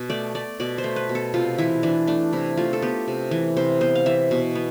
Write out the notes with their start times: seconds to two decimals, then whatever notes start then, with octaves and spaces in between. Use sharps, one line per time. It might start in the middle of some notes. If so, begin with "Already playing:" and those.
Already playing: B2
0.10 A3 D5
0.34 A3 D5
0.60 B2 D5
0.78 C5
0.84 A3
0.96 B4
1.09 B2
1.15 A4
1.34 C3 F4
1.58 E3 E4
1.83 E3 D4
2.07 A3 D4
2.33 C3 E4
2.57 A3 F4
2.73 A4
2.82 B3 G4
3.08 C3
3.31 E3
3.57 C3 C5
3.81 B3 C5
3.95 F5
4.06 E3 E5
4.31 B2
4.55 B3